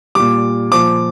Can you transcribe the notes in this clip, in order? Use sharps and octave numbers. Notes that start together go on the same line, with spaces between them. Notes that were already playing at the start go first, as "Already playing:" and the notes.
A#2 G3 D6
A#2 F3 D6